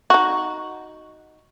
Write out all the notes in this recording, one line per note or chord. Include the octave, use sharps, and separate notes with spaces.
D#4 F#4